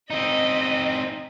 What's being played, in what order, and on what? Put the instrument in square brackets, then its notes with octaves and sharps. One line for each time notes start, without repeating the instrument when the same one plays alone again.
[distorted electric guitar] C4 D#4 [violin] D#5 B6